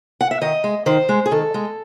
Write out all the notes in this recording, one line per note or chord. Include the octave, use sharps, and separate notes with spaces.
F#5
E5
D#3 D#5
G#3
D#3 C5
G#3
G#4
D#3 A4
G#3